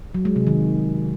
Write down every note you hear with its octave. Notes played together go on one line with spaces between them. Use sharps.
F#3
G#3
C3
D#3